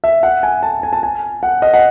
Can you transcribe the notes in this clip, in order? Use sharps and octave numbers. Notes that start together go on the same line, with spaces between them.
E5
F#5
G#5
A5
G#5
A5
G#5
F#5
D#5
F#5